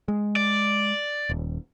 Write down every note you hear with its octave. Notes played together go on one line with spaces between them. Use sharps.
G#3
D5
D#1